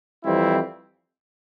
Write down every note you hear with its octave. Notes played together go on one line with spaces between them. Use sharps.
F2 E3 G3 C4 E4